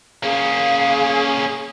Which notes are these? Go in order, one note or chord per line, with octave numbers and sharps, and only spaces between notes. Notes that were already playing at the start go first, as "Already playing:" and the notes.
A#3 C#4 G#4 F5